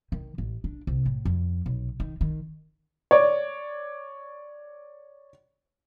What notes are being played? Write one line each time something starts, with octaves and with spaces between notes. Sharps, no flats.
D#3
A1
D4
C2
A2
F2
B1
D#3
D#3
C#5 D5